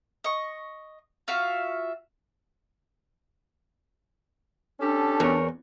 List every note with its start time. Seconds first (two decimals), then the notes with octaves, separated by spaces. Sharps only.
0.24 D#5 C#6
1.28 F4 F#4 E5 F5
4.80 C#4 D4 G4 A4
5.20 E2 A#4 C#5